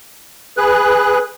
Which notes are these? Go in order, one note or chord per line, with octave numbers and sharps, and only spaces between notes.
G#4 B4 F#6